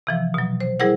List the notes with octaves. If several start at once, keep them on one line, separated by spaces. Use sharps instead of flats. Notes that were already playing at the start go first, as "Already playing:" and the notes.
C3 E3 F3
B2 F#3
C5
G3 E4 G#4 A#4 C5 F#5